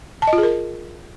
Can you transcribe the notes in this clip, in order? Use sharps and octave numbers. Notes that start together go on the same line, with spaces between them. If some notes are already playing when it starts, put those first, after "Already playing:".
A5
D#5
F4
G#4
A#4